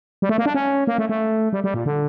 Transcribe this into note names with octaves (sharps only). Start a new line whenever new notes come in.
G3
A3
A#3
D4
C#4
A#3
A3
A3
G3
G3
A#2
D3